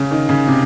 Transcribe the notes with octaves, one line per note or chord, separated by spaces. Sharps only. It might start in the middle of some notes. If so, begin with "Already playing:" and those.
Already playing: C#3
D#3
C#3
C3